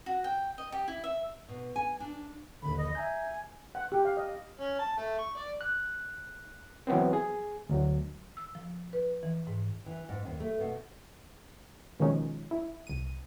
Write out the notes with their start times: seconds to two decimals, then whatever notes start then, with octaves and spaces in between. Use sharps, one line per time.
0.06 F#4
0.24 G5
0.58 D#5
0.72 G4
0.88 E4
1.04 E5
1.49 B2
1.76 G#5
2.00 D4
2.63 A#1 D#2 D3 B5
2.78 D#5
2.95 E5 G#5 A#5 G6
3.75 F#5
3.92 G4
4.05 F5
4.17 D#5
4.59 C#4
4.79 A5
4.97 A3
5.18 C#6
5.36 D5
5.61 F#6
6.87 E3 F#3 B3 C4
7.13 G#4
7.69 D2 F#3
8.37 E6
8.55 F3
8.93 B4
9.23 E3
9.47 G#2
9.86 E3
10.09 G#2
10.25 D#2
10.40 A3
10.60 B2
12.00 B2 D#3 F3 G#3 C#4 D#4
12.51 E4
12.87 C2 D#7